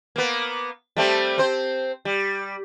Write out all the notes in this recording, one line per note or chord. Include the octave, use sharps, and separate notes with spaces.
A#3 B3
G3 A3 C4
C4 C5
G3